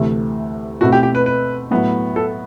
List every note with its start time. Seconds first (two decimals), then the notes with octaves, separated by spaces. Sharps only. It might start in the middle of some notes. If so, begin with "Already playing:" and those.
Already playing: D2 C3 E3 A3
0.81 B2 A3 C4 E4 F#4
0.92 G4
1.03 G4
1.15 B4
1.26 B4
1.71 A2 F#3 B3 E4
2.16 A4